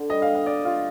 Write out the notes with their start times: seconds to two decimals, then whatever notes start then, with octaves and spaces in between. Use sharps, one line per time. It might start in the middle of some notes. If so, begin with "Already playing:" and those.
Already playing: D3
0.10 G3 D#5
0.22 F5
0.28 G3
0.35 F5
0.46 G4 D5
0.65 F4 G4